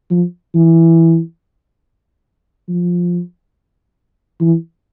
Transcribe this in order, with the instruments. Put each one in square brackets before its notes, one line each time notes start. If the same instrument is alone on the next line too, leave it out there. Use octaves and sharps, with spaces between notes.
[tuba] F3
E3
F3
E3